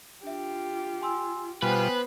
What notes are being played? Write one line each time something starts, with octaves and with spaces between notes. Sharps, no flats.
D4 F4 G4 E5
G#5 C6 E6
B2 G3 B3 F4 B4 C5 G5 G#5